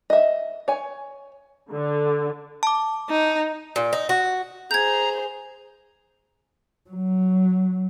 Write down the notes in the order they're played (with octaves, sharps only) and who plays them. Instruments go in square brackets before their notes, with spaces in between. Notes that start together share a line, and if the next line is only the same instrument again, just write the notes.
[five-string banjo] D#5 E5
C#5 G#5
[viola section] D3
[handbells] A5 D6
[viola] D#4
[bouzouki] A#2
D#4
F#4
[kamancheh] G#4 C5 [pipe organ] A#5 [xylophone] G6 G#6
[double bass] F#3